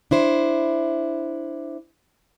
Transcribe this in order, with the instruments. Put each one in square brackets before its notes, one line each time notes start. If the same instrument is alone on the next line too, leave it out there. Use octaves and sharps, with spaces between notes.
[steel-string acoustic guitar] D4 E4 C5